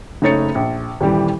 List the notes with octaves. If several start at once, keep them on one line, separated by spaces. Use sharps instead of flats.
F#1 A3 D#4 C#5 A6 C#7
A#1
D#1 E3 G3 G4